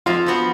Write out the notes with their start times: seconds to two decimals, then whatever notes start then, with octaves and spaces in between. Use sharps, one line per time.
0.06 F2 F4
0.26 F3 B3 F#4